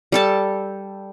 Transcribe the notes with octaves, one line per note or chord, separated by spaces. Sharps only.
G3 A4 A5